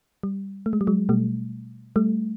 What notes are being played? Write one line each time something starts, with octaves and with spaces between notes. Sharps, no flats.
G3
A3
G#3
G3
F#3 G#3
B2 G3 A3
G3 A3